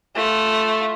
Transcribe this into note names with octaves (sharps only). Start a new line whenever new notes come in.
A3 F4